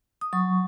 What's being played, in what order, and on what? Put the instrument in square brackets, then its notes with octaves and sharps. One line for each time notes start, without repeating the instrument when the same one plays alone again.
[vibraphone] D#6
F#3 C#6